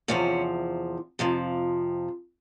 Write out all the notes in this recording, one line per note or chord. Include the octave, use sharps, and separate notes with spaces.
E2 C3 F3 C#4
F2 C3 F3